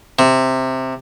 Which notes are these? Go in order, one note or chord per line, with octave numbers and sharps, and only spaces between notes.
C3